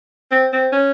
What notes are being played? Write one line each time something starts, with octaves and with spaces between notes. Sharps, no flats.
C4
C4
C#4